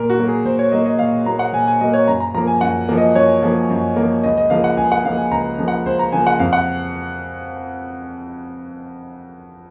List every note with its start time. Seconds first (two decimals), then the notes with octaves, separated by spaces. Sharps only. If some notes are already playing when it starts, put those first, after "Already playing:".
Already playing: A#2 A#4
0.10 F#4
0.18 F#3 A#3
0.28 G#4
0.45 A#2 C5
0.59 C#5
0.72 F#3 A#3 D#5
0.86 D#5
0.99 A#2 F5
1.26 F#3 A#3 A#5
1.39 F#5
1.53 A#2 G#5
1.67 G#5
1.81 F#3 A#3 D#5
1.94 C#5
2.08 F#2 A#5
2.20 A#5
2.34 F3 A#3 A#5
2.47 G#5
2.61 F#2 F#5
2.89 F3 A#3
2.97 D#5
3.15 F#2 C#5
3.43 F3 A#3
3.70 F#2
3.96 F3 A#3
4.23 C#2 D#5
4.37 D#5
4.50 C#3 F3 A#3 F5
4.64 F#5
4.77 C#2 G#5
4.92 F#5
5.04 C#3 F3 A#3 F5
5.17 G#5
5.31 C#2 A#5
5.59 C#3 F3 A#3
5.68 F#5
5.86 C#2 C5
5.99 A#5
6.12 C#3 F3 A#3 G#5
6.27 F#5
6.39 F2 F5
6.53 F#5